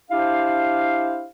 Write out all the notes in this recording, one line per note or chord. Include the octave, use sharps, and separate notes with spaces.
D4 E4 G4 C5 F5